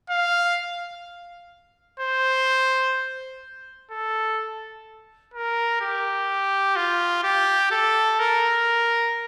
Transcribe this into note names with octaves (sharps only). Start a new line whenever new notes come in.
F5
C5
A4
A#4
G4
F4
G4
A4
A#4